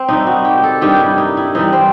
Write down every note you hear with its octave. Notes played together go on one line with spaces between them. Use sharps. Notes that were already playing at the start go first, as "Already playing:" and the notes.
Already playing: C4
C3 D#3 G3 D#4
F#4
G4
A4
G2 D#3 G3 G4
E4
D#4
E4
C3 E3 G3 D#4
C4